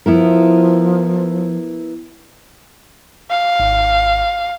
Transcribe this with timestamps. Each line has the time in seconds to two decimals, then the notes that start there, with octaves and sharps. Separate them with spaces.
0.06 F3 B3 E4 A#4
3.30 F5
3.60 G#1